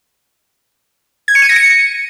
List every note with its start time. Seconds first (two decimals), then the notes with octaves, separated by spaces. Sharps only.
1.28 G#6
1.35 C#7
1.42 D#7
1.49 A#6
1.56 C#7